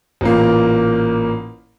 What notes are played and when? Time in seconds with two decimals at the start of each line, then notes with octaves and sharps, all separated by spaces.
0.21 A1 A#2 A#3